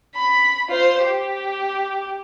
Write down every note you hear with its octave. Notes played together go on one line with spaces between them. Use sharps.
B5
F4 C5
G4